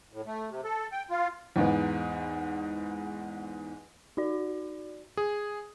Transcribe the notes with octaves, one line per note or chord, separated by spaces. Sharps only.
A2
A3
C3
A4
G5
F4
E2 G#2 B3
D#4 F#4 D5
G#4